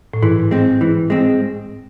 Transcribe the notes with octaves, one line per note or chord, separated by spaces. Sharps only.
A2
G#2 E3
G#3 C4
E3
G#3 C4